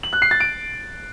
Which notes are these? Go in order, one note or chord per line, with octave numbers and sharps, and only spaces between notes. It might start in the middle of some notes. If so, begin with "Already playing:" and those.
F#7
F#6
C7
A6
D7